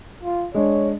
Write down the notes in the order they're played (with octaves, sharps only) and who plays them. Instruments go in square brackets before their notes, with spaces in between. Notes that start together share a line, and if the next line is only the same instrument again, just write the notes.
[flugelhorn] F4
[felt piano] G#3 D4 [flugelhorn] C#5